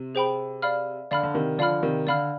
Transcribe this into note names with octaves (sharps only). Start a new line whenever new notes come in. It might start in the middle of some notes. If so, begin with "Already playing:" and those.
Already playing: C3
G#4 C5 G5 B5
D5 F5 B5 F6
D3 D5 F5 B5 F6
D3
C3 D#3
D3 F3 D5 F5 B5 F6
C3 D#3
D3 D5 F5 B5 F6